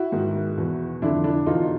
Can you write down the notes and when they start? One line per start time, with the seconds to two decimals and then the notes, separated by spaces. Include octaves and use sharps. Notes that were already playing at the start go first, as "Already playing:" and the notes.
Already playing: E4 F#4
0.12 G#2 D#3
0.57 E2 B2
1.02 F2 D3 D4 E4
1.24 D4 E4
1.46 E2 B2 D#4 F4